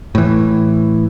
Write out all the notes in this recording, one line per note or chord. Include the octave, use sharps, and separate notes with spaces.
A2 E3